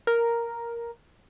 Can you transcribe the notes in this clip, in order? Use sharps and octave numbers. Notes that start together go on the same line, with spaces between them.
A#4